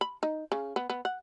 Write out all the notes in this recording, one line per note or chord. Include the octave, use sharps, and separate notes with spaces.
B5
D#4
C#3
B3
B3
F#5